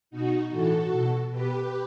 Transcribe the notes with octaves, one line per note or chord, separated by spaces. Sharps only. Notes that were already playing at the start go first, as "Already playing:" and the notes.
B2 D#4 F#4
A2 E3 F#4 A4
B2
B2 G4 B4